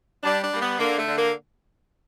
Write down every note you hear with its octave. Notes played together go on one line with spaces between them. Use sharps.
G3 D4
D4
G3 A#3
B3
D3 A#3
A3
D3
A#3